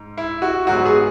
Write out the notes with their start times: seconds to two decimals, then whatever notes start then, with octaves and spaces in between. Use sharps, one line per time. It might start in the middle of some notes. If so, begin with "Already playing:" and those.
Already playing: G#2
0.17 E4
0.42 F#4
0.67 G#2 F#3 B3 F#4
0.86 G#4